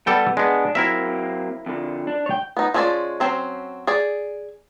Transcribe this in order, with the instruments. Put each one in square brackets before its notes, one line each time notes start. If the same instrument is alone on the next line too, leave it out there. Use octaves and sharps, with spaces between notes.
[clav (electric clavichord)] G3 A4 G5 [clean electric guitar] B3
[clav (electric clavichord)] G#3 B3 [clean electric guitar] D4
[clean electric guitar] F#3 A#3 C4 [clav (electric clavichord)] E4 A#4 E5
[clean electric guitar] F2 D3
D4
C#5 G5
[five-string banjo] B3 D#4
F3 G#3 C#4 E4 D5
F#3 C4 C#4 C5
G#4 D5